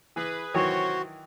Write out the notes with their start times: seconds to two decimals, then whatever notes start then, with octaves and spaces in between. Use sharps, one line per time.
0.16 E3 G#4 B4
0.54 C3 D#3 E3 F#3 F#4 C5 C#5